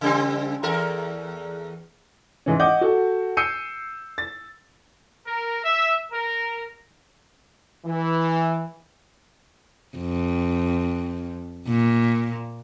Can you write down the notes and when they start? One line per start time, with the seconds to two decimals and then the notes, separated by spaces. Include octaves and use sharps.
0.01 C#3 G3 C4
0.63 E2 A4 A#4
2.46 G#2 E3 C#4
2.60 D#5 F#5 D6 G6
2.81 F#4 A4
3.37 E6 G6 C7 C#7 D#7
4.18 A6
5.27 A#4
5.64 E5
6.12 A#4
7.86 E3
9.97 F2
11.68 A#2